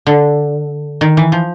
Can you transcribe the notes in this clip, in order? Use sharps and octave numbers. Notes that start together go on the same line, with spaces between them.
D3
D#3
E3
F3